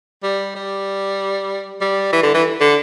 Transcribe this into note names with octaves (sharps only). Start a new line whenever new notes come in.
G3
G3
G3
E3
D3
E3
D3